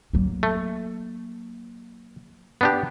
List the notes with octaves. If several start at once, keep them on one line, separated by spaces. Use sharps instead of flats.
F#3 A#3
A3
B3 D4 G4